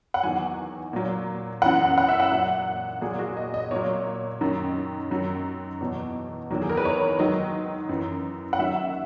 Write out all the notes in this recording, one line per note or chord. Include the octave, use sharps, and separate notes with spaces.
F#5
E2 D#3 F#3 G#5
A#2 F#3
F#2 E3 F#5
F#5
E5
F#5
A#2 F#3
A#2 F#3 G#4
F#4
D#5
D#5
A#2 F#3 C#5
F#2 D#3 F#3
F#2 D#3 F#3
E2 B2 F#3
E2 D#3 F#3
G#4
A#4
B4
C#5
G#2 D#3 F#3 D#5
F#2 E3
F#5
F#2 D#3 F#3 E5